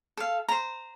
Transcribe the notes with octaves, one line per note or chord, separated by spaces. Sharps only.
A4 F5
C5 A#5